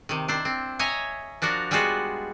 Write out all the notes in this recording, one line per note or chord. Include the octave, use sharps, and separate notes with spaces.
C3 D#3
D4 E4 C5
C4
C#5 D#5 E5 G#5 A#5
F3 D4 F#4 A#4
G3 G#3 B3 F4 F#4